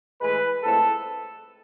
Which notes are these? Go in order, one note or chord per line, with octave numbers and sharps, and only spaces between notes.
A2 E3 G#3 B4
A2 F3 G#3 C4 A4